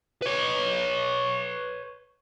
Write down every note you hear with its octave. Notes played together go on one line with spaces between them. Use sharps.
B4 C#5